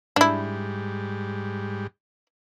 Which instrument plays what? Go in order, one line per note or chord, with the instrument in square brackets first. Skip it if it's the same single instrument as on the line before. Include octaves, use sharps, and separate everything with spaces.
[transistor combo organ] G#2 G3 [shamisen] D4 E4